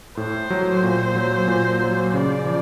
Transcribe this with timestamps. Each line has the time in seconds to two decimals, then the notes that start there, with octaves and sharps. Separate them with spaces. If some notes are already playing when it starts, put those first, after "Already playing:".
0.17 A2 C5
0.50 F#3
0.83 A#2
1.15 F#3
1.48 A#2
1.81 F#3
2.14 C#3 D5
2.46 F3